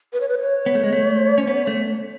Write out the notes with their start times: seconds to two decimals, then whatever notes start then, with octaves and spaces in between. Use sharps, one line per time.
0.13 B4
0.20 C#5
0.28 B4
0.39 C#5
0.66 B3
0.75 A3
0.84 G#3
0.93 A3
1.38 C#4
1.47 B3
1.67 A3